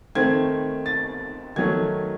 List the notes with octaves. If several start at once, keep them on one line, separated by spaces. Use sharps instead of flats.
D#3 A3 C4 G#6
A6
D#3 F#3 A3 G#6